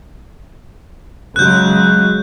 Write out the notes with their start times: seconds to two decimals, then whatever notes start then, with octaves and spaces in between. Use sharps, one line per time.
1.36 C#3 F#3 G#3 F#6 G6